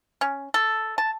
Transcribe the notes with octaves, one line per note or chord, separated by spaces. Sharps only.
C#4
A4
A5